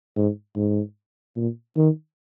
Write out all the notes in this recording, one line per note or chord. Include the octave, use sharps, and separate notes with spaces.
G#2
G#2
A#2
D#3